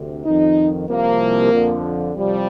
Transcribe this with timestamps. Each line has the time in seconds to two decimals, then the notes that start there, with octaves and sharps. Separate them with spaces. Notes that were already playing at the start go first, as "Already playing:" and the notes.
Already playing: D2 C3
0.25 F2 D#3 D#4
0.88 C2 C3 F3 A#3
1.52 F2 D3 F3
2.15 C2 C3 F3 G3